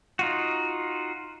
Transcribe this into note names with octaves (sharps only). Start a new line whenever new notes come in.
D#4 F4 F#4